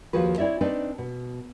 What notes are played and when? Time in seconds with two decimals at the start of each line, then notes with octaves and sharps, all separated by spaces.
0.13 D#2 F3 F#4 G#4 B4
0.38 C4 E4 C#5 D5 E5
0.61 C4 D4 D#4 B4 D5
0.98 B2